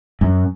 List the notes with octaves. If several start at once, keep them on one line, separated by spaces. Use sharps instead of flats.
F#2